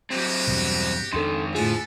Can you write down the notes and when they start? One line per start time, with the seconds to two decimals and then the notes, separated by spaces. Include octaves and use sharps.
0.10 F#3 C4 F#4 G4
0.47 E2 G2 B2
1.13 F2 G#2 D#3 D4 A4 C6
1.55 A2 D3 F3 B3 G#4 A4